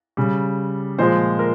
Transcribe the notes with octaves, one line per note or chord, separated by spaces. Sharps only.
C#3 G3
A#2 F3 G#3 C5
A#4